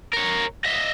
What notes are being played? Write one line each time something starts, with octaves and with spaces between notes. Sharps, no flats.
A#4 C#5
D#5 E5